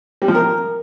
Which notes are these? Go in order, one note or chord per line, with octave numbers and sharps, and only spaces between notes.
G3
F3
A#4